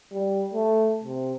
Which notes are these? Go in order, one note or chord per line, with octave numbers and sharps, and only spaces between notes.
G3
A3
C3